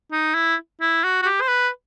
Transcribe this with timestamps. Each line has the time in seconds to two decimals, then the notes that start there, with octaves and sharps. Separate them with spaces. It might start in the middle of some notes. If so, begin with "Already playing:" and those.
0.12 D#4
0.34 E4
0.81 E4
1.04 F#4
1.22 F#4
1.25 G4
1.41 C5
1.48 B4